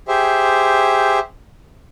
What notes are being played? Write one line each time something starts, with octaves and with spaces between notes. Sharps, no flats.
G4 G#4 C5 E5